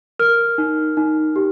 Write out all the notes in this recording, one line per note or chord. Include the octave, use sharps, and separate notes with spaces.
A#4 F6
D#4
D#4
G4